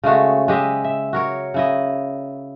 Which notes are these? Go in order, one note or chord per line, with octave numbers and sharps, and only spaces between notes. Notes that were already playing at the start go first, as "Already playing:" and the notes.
C#3 G#3 A3 F#4
G#3 G4 D#5 E5
E5
F#4 A#4 C#5
C#3 E4 D#5